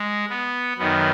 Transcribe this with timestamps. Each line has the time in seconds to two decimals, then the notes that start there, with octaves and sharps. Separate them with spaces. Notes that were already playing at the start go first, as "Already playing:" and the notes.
Already playing: G#3
0.30 B3
0.78 F#2 D#3 B3